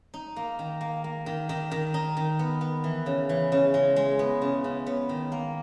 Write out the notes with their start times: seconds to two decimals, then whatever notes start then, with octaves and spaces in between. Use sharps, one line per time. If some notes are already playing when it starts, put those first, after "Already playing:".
0.14 D#4
0.36 A#3
0.59 D#3
0.81 A#3
1.04 A#3
1.26 D#3
1.49 D#3
1.71 D#3
1.94 D#4
2.17 D#3
2.39 B3
2.61 B3
2.84 E3
3.06 C#3
3.29 E3
3.52 C#3
3.74 G#3
3.96 G#3
4.19 B3
4.42 C#3
4.64 C#3
4.86 B3
5.09 D#3
5.32 A#3